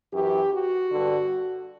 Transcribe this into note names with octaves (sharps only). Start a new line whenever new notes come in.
F#2 E3 G4
F#4
G2 D3